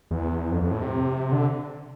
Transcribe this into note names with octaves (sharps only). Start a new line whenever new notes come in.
E2
F2
F2
A2
C3
D3